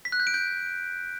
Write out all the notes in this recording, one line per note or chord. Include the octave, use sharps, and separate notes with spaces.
B6
F#6
G6
D7
G6